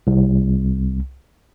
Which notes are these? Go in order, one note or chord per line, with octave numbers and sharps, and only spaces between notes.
C2